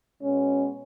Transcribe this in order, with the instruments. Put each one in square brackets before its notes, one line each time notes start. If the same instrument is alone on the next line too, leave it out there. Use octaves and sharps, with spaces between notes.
[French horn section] B2 G#3 B3 C#4